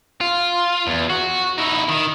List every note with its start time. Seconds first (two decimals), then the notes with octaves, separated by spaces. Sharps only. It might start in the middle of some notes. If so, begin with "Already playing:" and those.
0.21 F4
0.87 E2
1.10 F#4
1.58 D#4 E4
1.89 D#3